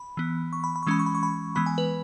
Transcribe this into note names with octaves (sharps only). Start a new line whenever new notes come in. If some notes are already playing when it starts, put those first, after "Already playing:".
Already playing: B5
E3 B3
C#6
B5
B5
C#6
E3 G#3 C#4 B5
C#6
B5
C#6
B5
E3 G#3 B3 B5
G#5
B4